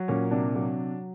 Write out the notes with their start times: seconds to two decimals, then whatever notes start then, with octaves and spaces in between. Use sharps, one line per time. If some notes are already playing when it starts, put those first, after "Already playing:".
Already playing: F#3
0.08 A#2 C#4
0.31 C3 D4
0.55 F#3